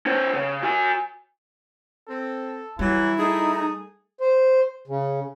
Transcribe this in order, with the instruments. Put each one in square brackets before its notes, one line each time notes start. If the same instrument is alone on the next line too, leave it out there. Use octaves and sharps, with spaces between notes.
[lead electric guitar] C#4 C5
C#3
F#4 G#5
[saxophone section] C4 [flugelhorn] A4
[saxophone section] E3 F#3 [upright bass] G3 [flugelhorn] E4
[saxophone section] A3 G#4 [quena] D#4
[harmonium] C5
C#3